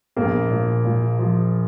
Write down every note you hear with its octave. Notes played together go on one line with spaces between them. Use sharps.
A#1 A#3
A#2
A#2
F3